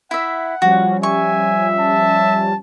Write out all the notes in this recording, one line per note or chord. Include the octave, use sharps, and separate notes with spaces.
E4 E5 F#5
F3 G3 C#4 F#4
E5 G#5 C#6
A5